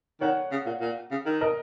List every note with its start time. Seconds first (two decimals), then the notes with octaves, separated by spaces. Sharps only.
0.21 D#3 C#5 F#5
0.51 C#3
0.66 A#2
0.81 A#2
1.11 C#3
1.26 D#3
1.41 A#4 D#5